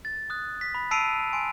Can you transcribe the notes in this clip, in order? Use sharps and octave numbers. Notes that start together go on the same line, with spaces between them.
A6
D#6 F#6
B6
B5
A5 E6 C7 D7 D#7 F7
G#5 C6 D7